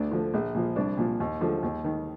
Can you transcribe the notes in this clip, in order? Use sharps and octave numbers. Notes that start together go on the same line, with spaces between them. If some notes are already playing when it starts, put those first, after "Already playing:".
Already playing: D2 D4
D3 F3
A#1
A#2 F3
C2 D4
A#2 F3
D#2
D3 F3
D#2
D#3